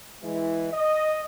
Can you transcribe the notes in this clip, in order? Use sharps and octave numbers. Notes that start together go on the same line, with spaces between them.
E3 G#3 E4
D#5